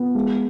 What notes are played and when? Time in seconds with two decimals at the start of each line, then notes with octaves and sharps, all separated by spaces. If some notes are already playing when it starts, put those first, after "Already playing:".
Already playing: B3
0.15 G#3